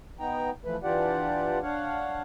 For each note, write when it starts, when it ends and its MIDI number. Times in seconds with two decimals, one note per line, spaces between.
0.19 0.50 59
0.19 0.50 63
0.19 0.50 79
0.19 0.50 82
0.65 0.76 52
0.65 0.76 53
0.65 0.76 57
0.65 0.76 71
0.83 1.59 52
0.83 1.59 62
0.83 1.59 65
0.83 1.59 67
0.83 1.59 74
0.83 1.59 78
1.63 2.22 62
1.63 2.22 73
1.63 2.22 77
1.63 2.22 78